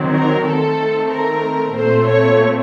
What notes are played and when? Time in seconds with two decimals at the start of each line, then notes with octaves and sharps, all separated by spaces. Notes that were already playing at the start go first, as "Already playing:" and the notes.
Already playing: D#3 F#3 C4
0.14 A#4
0.46 D#3 A3 C4 A4
1.11 A#4
1.74 A#2 A3 C4 C5
2.07 C#5